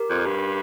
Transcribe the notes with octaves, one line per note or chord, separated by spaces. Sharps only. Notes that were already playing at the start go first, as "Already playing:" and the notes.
Already playing: G4 A#4
F2
G2